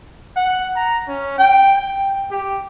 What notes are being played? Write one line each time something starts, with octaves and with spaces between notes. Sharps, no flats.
F#5
A#5
C#4
G5
G5
G4